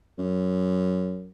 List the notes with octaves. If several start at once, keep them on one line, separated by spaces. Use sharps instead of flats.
F#2